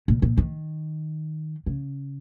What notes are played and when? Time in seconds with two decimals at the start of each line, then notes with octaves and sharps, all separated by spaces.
0.08 A#2
0.22 A#2
0.38 D#3
1.66 C#3